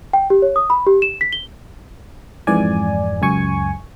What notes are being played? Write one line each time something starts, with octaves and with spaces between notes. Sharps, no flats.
G5
G4
C#5
D#6
B5
G4
E7
B6
G7
F2 G#2 E3 D5 G#5
C#2 F#2 G#5 C#6